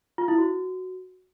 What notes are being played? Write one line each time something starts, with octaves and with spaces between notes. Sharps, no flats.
F4
E4
F#4